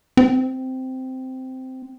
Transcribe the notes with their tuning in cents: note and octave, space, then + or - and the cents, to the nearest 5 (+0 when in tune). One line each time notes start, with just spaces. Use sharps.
C4 -10